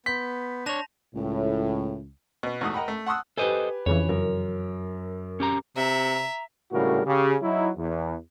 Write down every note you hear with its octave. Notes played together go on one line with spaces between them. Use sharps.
B3 C6 G6 B6
D4 C#5 A5 A#6 F7
C#2 A2
B2 B3
E2 G#2 A3 F#4 D#6
A#4 D#5 F#5 G5 B5
A3
F#5 A5 C6 D#6 E6 F#6
G4 A4 B4 C5 D#5 G#5
F2 C#3 E3 C#5
F#2 A#4
C#4 G4 A#5
C3 E5 A#5
G#1 A2 C#3 G3 F#4 A#4
C#3 G4
F#3 D#4 E4
E2